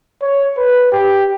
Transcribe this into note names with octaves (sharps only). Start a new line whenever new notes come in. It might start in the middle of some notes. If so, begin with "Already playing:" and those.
C#5
B4
G4